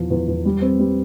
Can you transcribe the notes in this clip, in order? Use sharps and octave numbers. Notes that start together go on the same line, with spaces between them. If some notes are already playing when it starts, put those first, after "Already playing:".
Already playing: E2 F3
E2
E2
G3
C4
G3